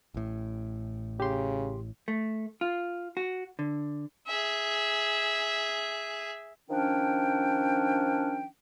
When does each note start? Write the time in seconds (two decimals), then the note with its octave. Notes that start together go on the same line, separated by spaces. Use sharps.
0.14 A1 A2
1.20 C#3 G4 C6
2.08 A3
2.61 F4
3.17 F#4
3.59 D3
4.27 G#4 E5
6.70 D#3 F3 C#4 D4 G5